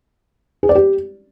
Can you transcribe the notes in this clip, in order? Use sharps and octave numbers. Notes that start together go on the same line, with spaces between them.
G#4
D5
G4